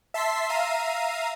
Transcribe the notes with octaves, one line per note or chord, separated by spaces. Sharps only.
E5 A5 C6 E6 B6 C7
E5 F5 A#5 C7 D#7